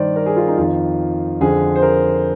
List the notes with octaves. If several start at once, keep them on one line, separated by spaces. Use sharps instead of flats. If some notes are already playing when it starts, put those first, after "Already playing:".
Already playing: G2 D#3 C5 D5
A#4
G#4
F4
D#4
F2 D#3 F4
F2 D3 F3 G#4
C5
A#4